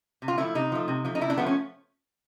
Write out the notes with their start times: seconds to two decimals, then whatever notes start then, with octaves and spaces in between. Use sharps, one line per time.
0.22 C3
0.28 F4
0.38 F3 A3 E4
0.55 C3 D#4
0.72 F3 A3
0.88 C3
1.05 F3 A3
1.15 D#4
1.21 C3 E4
1.30 D4
1.38 F3 A3 B3
1.46 C#4